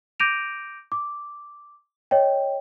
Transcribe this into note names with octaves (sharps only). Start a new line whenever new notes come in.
D6 G6 A#6 D7 D#7 F7
D6
C#5 D#5 G5